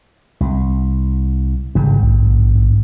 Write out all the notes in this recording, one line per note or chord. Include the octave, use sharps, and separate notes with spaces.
C2
G#1 G2 C#3
A#1